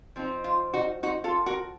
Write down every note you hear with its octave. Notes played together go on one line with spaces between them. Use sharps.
F3 C4 D#4
F4
D#4 F#4
D#4 F#4
F4 A4
F#4 A#4